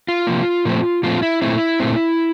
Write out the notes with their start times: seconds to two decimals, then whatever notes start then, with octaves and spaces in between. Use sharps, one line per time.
0.08 F4
0.27 C3 F3 A#3
0.65 A#2 F3 A3 C4
1.03 A#2 F3 A3 C4 F4
1.22 E4
1.42 A#2 A3 C4 E4
1.80 A#2 A3 C4